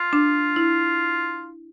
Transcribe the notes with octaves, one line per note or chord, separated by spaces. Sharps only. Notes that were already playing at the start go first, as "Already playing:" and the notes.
Already playing: F4
D4
E4